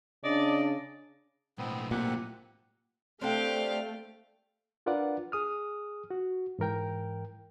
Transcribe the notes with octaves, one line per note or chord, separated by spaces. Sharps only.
C#3 D4 D5 D#5
B1 A2 B3 C4
A#2 C4 G4 F#5
A3 C4 D4 G4 F5 G5
D4 F4 A#4 B4 D5 F#5
G#4 D#6 F6
F#4
G#2 E3 A#4 G5